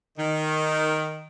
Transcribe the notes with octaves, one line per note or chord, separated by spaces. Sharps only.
D#3